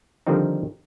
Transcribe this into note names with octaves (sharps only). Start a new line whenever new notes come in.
D3 D#3 F3 G3 C4 D#4